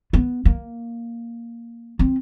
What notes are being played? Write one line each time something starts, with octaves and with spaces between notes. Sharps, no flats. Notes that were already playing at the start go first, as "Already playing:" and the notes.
B3
A#3
C4